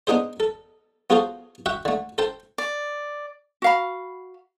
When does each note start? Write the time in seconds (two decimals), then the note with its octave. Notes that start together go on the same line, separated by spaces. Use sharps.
0.07 B3 D4 D#4 G#4 C5
0.40 A4
1.10 B3 F4 F#4 G#4 A4 C5
1.66 F#4 E5 F#5 G5
1.85 D3 A3
2.18 A4 C5 G5 A5
2.58 D5
3.62 F#4 F5 B5